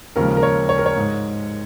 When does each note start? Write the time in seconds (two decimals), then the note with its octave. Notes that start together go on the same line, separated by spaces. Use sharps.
0.16 D#2 C#3 F3 G#3 A#4
0.37 A#4
0.43 C#5
0.69 C#5
0.78 A#4
0.86 C#5
0.96 G#2 G#3